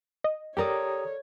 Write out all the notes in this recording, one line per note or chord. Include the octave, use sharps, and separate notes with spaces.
D#5
G4 A4 A#4 C#5 D5 A#5 D#6